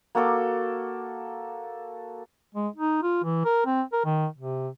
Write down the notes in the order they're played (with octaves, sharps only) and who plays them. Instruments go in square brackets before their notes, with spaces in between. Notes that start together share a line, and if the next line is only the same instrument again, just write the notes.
[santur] A#3 F#4 A4 D6
[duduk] G#3
D#4
F4
E3
A#4
C4
A#4
D#3
C3